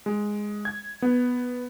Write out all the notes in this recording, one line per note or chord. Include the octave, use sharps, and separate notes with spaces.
G#3
G#6
B3